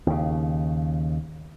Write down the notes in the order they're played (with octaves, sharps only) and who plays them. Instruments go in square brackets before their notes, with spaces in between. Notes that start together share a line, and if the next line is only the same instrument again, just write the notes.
[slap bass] D#2 C#3